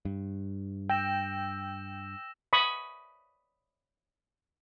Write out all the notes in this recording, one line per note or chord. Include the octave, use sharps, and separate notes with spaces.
G2
G5 E6 A#6 E7
B5 C#6 D#6